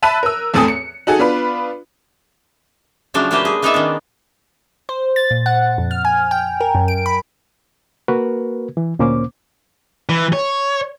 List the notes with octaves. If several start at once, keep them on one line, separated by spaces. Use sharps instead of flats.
E5 A5 B5 F#6 D#7
A#4 E6
E2 A2 C4 A4 G#5 D#6
C#7
D#4 F#4 G#4 A4
B3 D4 F4 B4
C#3 F3 F#3 A3 D4
F#3 A3 A#3 G4 B4 C5
G#4
A#3 B3 D#4 G#4 D5 E5
D#3 C#4 D4
C5
A6
A#2
F#5
F2
F6
G#5
G5
A#4
F#2
D7
B5
A#3 F#4 A#4 B4
E3
D2 A#2 A#3 C#4 C5 D6
E3
C#5